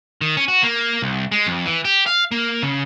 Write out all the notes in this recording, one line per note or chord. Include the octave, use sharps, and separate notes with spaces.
D#3
C#4
F#4
A#3
C2
G#3
F2
E3
G4
F5
A#3
C#3